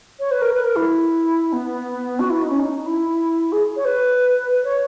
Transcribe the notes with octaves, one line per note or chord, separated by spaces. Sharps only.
C#5
B4
A#4
B4
A#4
E4
B3
F#4
E4
D#4
C#4
D#4
E4
G#4
C#5
B4
B4
C#5